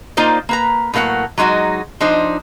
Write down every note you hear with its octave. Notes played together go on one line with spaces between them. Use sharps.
A#3 D#4 F4 C5 D5
A#3 B4 A#5
A2 F#3 A#3 E4 F#5
F#3 G#3 D#4 F4 F#4
F3 D4 D#4 C5